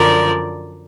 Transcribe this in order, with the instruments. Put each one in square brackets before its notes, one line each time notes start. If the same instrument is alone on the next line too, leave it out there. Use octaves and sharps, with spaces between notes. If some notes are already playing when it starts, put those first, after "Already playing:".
Already playing: [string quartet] F#2 D3 F3 A#4 D5